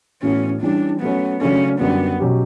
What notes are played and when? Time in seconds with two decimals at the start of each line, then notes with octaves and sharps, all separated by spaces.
0.22 A2 E3 B3 C#4 F#4 A4
0.62 E3 G3 C#4 D4
1.01 F#3 A3 B3 C#4
1.41 C#3 F#3 A3 C#4 D4 A4
1.81 F#2 D3 G3 B3 D4 F#4
2.20 B2 F#3 C#4 G4